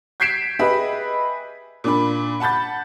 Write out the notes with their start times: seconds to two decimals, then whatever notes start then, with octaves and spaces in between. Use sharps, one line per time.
0.20 G6 G#6 B6 C7 D7 E7
0.59 G4 G#4 B4 D#5 E5 B5
1.84 A#2 D4 B5
2.40 F#5 A5 B5 G6 A6